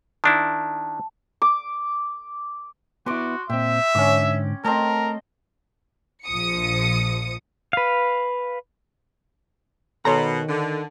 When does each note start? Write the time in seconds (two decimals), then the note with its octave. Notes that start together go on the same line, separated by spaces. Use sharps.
0.24 D#3 D4 E4 A5
1.42 D6
3.06 B3 E4 F#4 C6 D6
3.50 A#2 C4 E5 G5
3.95 G#2 D3 C#4 D6
4.64 A3 C4 A#4 D#5 A5
6.25 A#1 F3 D#6 C#7
7.73 B4 F5
10.05 B2 D#3 A4 C#5 A#5 C6
10.49 D3